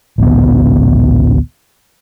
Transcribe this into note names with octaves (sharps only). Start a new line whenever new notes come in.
A1 D2 A#2 B3